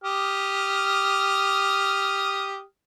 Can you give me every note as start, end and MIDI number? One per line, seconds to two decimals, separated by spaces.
0.04 2.61 67
0.04 2.61 87
0.04 2.61 89